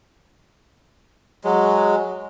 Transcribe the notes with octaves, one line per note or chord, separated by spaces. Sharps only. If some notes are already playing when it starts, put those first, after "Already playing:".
F#3 G#3